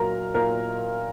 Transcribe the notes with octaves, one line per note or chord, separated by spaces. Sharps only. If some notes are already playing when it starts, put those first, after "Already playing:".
Already playing: A#2 F#3 A#4 A#5
A#2 A#4 A#5